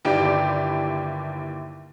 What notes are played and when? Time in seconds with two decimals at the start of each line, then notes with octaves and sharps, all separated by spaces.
0.05 G1 D#2 E4 G4 D5 G5